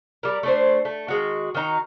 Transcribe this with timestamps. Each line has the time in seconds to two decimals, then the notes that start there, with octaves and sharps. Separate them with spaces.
0.23 G3 A#4
0.43 A3 D4 C5
0.85 A3
1.08 D#3 G#3 F#4
1.55 D#3 F#3 D#4 A#5